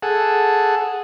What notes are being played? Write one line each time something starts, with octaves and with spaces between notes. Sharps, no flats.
G#4 A4 F#5